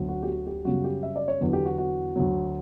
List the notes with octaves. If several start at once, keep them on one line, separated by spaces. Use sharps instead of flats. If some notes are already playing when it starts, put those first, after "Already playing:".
Already playing: D2 D3 F#3
F#4
G4
F#4
G4
F#2 C#3 G3 F#4
G4
E5
D5
C#5
E2 D3 F#3
G4
F#4
F#4
D2 D3 F#3